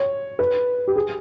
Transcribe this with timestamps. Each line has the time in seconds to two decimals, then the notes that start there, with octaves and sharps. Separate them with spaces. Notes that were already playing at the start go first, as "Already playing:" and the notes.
Already playing: C#5
0.39 B4
0.88 G4
0.96 G#4